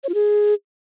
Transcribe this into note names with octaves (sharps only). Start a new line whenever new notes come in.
C#5
F4
G#4